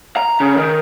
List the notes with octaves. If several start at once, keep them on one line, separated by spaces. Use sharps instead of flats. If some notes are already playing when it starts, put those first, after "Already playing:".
A#5
C#3
D#3